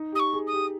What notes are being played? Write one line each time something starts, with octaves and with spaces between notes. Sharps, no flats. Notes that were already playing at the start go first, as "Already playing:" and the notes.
Already playing: D#4
G4 D#6
C#6
G#4
D#6
G4